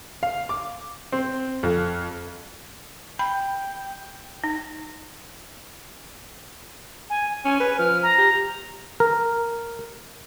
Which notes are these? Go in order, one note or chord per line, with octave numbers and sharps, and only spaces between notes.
F5
D6
C4
F2
G5 B5
D#4
G#5
C#4 G#5
B4
F3 F6
A#5
G4
A#4